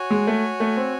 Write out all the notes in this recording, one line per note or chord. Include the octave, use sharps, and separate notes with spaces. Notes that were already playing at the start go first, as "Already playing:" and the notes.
Already playing: F#4 C#5 G#5
G#3
A3
A3
C4